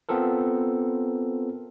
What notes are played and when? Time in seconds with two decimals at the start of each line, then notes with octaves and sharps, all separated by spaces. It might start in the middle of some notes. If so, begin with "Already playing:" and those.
0.09 B3 C4 F4 A4 A#4